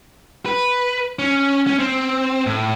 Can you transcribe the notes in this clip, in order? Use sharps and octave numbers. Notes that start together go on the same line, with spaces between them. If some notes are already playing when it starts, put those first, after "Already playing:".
B4
C#4
C#4
C4
A2